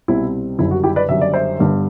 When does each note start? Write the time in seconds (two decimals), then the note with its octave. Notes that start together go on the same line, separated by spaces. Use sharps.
0.08 C2 B2 G3 C4 E4
0.58 F#1 F#2 D3 G3 E4
0.71 F#4
0.83 E4 G4
0.96 B4 D5
1.08 F#1 F#2 D3 G3 E5
1.21 D5
1.34 C5 E5
1.59 G1 G2 D3